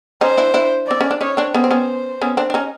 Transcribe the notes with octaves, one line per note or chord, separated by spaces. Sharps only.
C#4 D#4 C5
D4 E4
D4 E4
C4 D5
C#4
D4
C#4 D#4 C#5
C4 D4
B3 C#4 C5
C4
B3 C#4
B3 C#4
C4 D4
D4
C#4 D#4